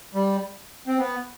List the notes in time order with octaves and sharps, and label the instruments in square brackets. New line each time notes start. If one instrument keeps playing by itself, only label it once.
[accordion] G3
C4
B3